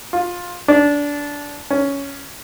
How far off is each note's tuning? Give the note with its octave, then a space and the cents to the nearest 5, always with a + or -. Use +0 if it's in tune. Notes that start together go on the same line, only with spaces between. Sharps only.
F4 +15
D4 -20
C#4 +10